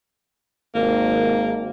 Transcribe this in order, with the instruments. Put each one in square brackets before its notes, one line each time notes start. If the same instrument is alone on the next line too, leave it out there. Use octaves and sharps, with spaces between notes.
[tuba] G#1 [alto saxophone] A#3